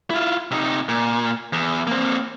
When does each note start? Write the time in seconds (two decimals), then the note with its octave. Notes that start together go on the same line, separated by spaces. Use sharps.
0.10 E4 F4
0.51 C3 D#4
0.89 A#2
1.53 E2
1.87 A#3 C4